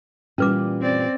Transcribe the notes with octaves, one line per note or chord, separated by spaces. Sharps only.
A#2 E3 G3 C#4 B4 D6
C4 D5